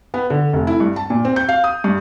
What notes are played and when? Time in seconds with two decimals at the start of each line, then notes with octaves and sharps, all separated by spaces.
0.14 B3
0.30 D3
0.53 F1
0.67 E4
0.80 G2
0.96 A5
1.10 A#2
1.25 C4
1.36 G6
1.49 F5
1.64 D#6
1.84 G2